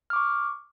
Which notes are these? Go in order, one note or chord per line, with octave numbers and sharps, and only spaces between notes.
C#6 D6 F6